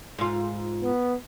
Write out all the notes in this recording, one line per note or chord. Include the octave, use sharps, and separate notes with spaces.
G#2 F4
B3